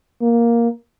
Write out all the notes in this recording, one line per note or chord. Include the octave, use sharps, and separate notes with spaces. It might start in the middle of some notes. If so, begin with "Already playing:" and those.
A#3